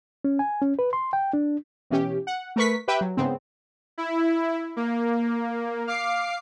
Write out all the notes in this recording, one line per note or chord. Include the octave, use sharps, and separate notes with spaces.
C#4
G#5
C#4
B4
C6
G5
D4
B2 E3 C#4 G4
F#5
A3 A#4 B4 C#6 B6
G4 B4 E5 G5
F#3
G#2 C#3 B3 C4
E4
A#3
F5 D6 C7